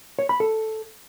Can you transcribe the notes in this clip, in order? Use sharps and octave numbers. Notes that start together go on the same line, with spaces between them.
C#5
B5
A4